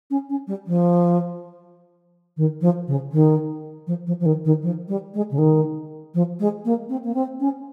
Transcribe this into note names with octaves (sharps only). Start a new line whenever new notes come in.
C#4
C#4
G3
F3
D#3
F3
C#3
D#3
F3
F3
F3
D#3
D#3
F3
G3
G#3
C#3
D#3
F3
G#3
A#3
C4
A#3
C4
C#4